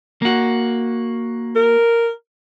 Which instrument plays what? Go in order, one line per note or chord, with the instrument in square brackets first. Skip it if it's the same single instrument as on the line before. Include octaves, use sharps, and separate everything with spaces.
[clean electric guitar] A#3 F#4
[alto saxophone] A#4